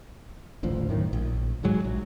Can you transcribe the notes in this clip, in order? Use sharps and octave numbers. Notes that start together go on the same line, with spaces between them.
D#1 A1 D2 F3
F#2 A2 D#3
A#1
D1 G#2 F#3 G#3
A#1 F#3